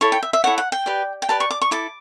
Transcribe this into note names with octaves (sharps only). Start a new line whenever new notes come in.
E4 A4 C#5 C#6
G5
E5
E5
E4 A4 C#5 F#5
F#5
G5
G4 B4 D5
G5
G4 B4 D5 A5
C#6
D6
C#6
E4 A4 D6